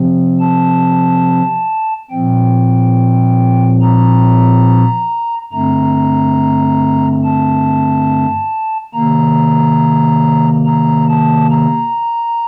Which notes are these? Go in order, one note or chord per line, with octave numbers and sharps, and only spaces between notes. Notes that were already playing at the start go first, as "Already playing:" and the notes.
Already playing: C3 F3 C4
A5
A#2 F3 C4 G5
A#5
G2 D3 A3 C4 A#5
A5
C3 D#3 A#3 A#5
A#5
A5
A#5